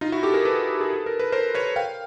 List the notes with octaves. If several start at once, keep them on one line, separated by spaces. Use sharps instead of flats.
D#4 F4
E4 F#4
G4 A4
G#4 A#4
A4 B4
G#4
A4
A#4
B4
A#4 C5
B4 C#5
F5 G5